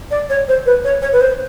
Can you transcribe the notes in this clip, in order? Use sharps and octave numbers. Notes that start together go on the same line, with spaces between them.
D5
C#5
C5
B4
C#5
C#5
B4
C5